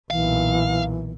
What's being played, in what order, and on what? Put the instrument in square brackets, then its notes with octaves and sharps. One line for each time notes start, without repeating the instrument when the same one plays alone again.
[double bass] B1 A#2 [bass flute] E3 [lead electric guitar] F5